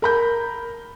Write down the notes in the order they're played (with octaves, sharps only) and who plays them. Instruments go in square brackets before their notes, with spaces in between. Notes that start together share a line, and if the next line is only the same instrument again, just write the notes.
[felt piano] A#4 B5 G6